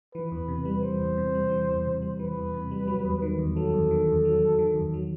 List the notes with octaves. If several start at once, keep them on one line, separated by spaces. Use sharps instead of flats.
E3 B4
E2
C3
G3
E3 C5
E2
C3
G3
E3
E2
C3
G3
E3 B4
E2
C3
G3
F#3
E2
D#3
E2
F#3 A4
E2
D#3
E2
F#3
E2
D#3
E2
F#3